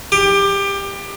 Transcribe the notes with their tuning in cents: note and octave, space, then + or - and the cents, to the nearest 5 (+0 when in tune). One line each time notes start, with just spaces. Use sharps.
G4 +20